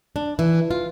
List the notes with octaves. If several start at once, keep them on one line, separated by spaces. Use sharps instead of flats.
D4
E3
F4